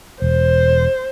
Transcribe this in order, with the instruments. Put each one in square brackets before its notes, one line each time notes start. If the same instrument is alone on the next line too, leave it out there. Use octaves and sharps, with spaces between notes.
[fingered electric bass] E1 [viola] C5